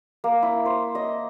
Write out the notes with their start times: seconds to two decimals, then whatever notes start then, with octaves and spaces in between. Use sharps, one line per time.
0.24 A#3
0.43 E4
0.66 C5
0.95 D#5